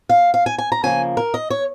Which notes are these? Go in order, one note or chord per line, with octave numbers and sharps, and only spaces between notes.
F5
F5
G#5
G#5
A#5
C#3 F3 A#3 G#5
A#4
D#5
C#5